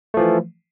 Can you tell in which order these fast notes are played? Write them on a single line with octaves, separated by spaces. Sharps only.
A3 F3 E3